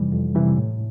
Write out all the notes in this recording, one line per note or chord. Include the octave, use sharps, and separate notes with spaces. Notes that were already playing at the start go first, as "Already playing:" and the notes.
Already playing: F2 C3 E3 G3
F2
C3 E3 G3
A2